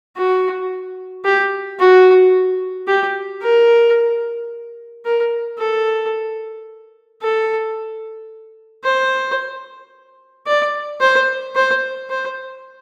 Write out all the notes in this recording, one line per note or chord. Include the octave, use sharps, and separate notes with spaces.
F#4
G4
F#4
G4
A#4
A#4
A4
A4
C5
D5
C5
C5
C5